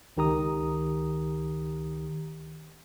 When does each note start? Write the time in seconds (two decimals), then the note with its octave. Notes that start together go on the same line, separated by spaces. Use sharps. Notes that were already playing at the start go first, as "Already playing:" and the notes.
0.17 C#2 D#3 G4 A#5 D#6